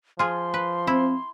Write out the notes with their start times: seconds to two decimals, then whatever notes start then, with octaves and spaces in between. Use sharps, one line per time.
0.19 F3 F4 G#4 C6
0.54 B4
0.87 C4 E4